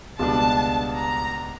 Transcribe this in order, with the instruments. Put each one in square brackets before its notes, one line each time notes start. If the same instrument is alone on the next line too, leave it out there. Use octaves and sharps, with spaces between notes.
[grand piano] C#2 B2 G3 B3 D4 [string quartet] A5
[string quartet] A#5